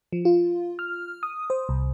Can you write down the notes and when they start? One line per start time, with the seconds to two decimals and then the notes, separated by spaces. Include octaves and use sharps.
0.13 F3
0.25 F4
0.79 F6
1.23 D#6
1.50 C5
1.69 C2